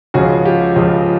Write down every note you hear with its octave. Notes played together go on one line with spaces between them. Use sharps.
C#2 C#3 F3 F#4 G#4
F4 G4
C#2 C#3 F3